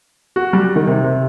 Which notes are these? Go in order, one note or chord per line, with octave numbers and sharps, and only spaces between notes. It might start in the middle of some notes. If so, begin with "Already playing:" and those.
F#4
G3
D#3
C3
C3